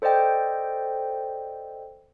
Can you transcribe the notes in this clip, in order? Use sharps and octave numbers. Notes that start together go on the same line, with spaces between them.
A4 C5 D5 D#5 G5